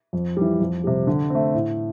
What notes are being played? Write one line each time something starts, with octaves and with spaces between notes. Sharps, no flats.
F2
E3 G3
F2
C3 G3
D3
A3 C4
A2